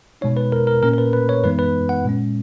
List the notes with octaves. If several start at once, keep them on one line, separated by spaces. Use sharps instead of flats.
B2 G#3 D#4 C#5
B4
A#4
A#4
A#2 A#3 C#4 A#4
A#4
B4
B4
C#5
F#2 E3 G#3 B3 D#4 B4
B4
F#5
A#2 G#3 C#4